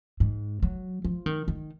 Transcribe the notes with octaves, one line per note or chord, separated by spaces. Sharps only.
G#2
F#3
F3
D#3
D#3